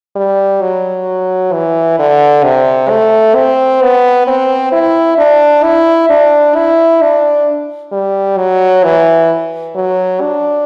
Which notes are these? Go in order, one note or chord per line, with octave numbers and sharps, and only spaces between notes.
G3
F#3
E3
D3
C3
A3
C4
B3
C4
E4
D4
E4
D4
E4
D4
G3
F#3
E3
F#3
D4